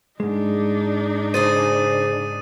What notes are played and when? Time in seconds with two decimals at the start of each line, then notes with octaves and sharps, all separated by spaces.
0.20 G#2 G#3 D4 D#4
1.34 C#3 G#4 C5 D#6 A6 D#7